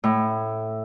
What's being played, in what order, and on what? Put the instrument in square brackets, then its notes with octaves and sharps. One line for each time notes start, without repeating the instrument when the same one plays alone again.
[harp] A2